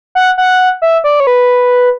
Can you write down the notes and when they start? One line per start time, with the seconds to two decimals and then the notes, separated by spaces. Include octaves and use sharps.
0.15 F#5
0.38 F#5
0.82 E5
1.04 D5
1.20 C#5
1.27 B4